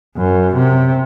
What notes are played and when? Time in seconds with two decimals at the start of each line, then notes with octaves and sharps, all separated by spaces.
0.17 F#2
0.56 C3